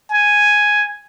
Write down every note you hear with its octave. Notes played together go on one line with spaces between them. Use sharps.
G#5